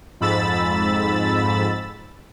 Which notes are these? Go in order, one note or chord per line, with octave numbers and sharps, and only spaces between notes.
F2 G#2 B5 E6 A6